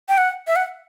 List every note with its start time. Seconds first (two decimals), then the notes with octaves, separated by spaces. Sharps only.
0.09 G5
0.18 F#5
0.47 E5
0.56 F#5